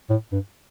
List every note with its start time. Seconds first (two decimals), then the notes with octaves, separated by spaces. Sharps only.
0.10 A2
0.32 G2